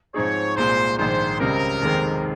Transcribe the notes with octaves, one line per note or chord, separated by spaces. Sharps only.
G#2 F3 C4 D#4 G#4 C#5
C2 A#2 G#3 C5
A#1 G#2 D#3 G#3 C5
C#2 C#3 G3 C4 A#4
F1 D#2 D#3 G#3 C4